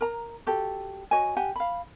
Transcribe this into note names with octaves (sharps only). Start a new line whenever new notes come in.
A#4 A#5
F#4 G4 A4
F#4 C#5 D#5 G#5
G4 F#5 G#5
F5 B5